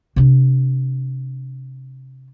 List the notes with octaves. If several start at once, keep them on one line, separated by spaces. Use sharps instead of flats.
C3 D4